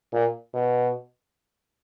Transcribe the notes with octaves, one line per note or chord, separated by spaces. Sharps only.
A#2
B2